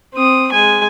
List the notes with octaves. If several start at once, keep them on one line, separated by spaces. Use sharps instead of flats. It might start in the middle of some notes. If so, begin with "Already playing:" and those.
C4 D#6
G#3 G#5